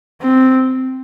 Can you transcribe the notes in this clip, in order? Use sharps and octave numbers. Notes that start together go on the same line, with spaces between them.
C4